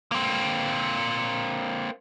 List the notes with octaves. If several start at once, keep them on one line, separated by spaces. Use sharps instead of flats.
A#3 C4